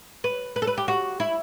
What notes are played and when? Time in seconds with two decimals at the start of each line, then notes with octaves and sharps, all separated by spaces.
0.24 B4
0.56 B4
0.62 A4
0.67 B4
0.78 G4
0.88 F#4
1.20 E4